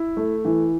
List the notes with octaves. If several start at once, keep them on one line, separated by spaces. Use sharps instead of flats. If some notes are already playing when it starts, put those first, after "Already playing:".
Already playing: E4
A3
E3